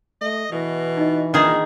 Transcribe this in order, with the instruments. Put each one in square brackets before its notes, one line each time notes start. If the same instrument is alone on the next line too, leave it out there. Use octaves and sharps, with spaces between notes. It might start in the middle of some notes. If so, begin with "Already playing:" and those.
[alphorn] A3 [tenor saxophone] D#5
[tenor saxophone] B2 [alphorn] E3 [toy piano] B4
[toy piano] D#4 D#5
[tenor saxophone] A#2 [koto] D#3 G#4 [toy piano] D4 F4